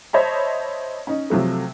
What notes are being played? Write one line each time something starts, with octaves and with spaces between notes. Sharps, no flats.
C5 C#5 D#5 E5 A5 B5
C#4 D#4
C3 F3 F#3 A3